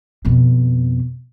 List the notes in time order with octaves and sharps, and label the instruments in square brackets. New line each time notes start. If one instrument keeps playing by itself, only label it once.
[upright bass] F2 B2